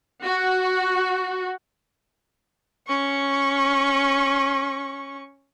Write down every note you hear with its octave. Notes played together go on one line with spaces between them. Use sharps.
F#4
C#4 C#6